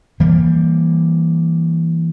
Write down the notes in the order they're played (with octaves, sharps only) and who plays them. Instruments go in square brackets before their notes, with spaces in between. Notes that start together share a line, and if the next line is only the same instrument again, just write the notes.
[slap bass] E3 G3 A#3